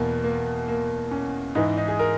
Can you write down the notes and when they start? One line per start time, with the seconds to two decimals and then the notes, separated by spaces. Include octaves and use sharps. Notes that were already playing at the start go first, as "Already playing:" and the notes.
Already playing: E2 B2 A#3
0.24 A#3
0.68 A#3
1.11 C#4
1.55 G#2 E3 D#4
1.77 D#4
1.88 G#4
1.99 A#4